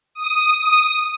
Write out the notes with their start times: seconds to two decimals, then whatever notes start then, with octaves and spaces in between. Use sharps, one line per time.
0.14 D#6